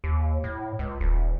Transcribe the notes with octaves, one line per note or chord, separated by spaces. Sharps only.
D#2
A2
C#2
D#1